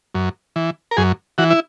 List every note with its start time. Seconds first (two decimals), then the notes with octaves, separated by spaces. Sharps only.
0.15 F#2
0.56 E3
0.91 A#4
0.97 F#2 G#4
1.38 E3 F#4
1.50 E4